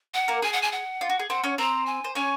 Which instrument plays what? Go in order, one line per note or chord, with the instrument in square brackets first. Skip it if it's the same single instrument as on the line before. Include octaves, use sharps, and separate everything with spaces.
[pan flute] F#5
[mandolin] A#3 A#4
[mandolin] G#4 [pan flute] G#5
[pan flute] F#5
G#5
F#5
[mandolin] F4
F#4
G#4
[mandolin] C4 C5 [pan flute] F#5
[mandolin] C#4 C#5
[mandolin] C4 C5 [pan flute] A#5
[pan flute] G#5
[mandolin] C5
[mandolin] C#4 C#5 [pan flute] G#5